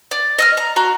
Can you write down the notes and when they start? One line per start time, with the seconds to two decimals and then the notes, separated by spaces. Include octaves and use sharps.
0.11 D5
0.39 D#5 E6 F6
0.57 A#5
0.76 F#4 A#5 C6